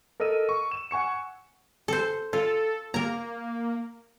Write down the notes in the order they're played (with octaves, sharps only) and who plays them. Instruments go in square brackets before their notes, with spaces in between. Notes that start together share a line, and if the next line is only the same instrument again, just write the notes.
[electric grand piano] A4 A#4 D#5 E6 D#7
C#6
E7
F#5 G#5 C#6 C#7
[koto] A4 C5
[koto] F4 [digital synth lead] A4
[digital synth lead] A#3 [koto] A#4 A#5